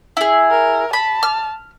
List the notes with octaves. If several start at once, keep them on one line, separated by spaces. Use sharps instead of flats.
E4 G#4
A#4
A5 B5
F6